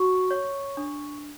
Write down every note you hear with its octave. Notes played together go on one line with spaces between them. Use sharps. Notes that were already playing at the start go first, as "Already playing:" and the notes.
Already playing: F#4 C#6
C#5
D4